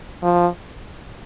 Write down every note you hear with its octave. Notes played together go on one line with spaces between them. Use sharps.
F3